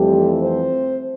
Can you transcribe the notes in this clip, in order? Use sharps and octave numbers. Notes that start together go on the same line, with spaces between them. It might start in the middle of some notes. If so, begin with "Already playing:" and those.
Already playing: F2 E3 G3 A3 C4 G4
C4 C5